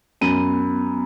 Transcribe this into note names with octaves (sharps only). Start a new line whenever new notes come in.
F#2 B3